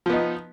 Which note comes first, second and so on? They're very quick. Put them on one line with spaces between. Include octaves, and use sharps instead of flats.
F3 B3 D#4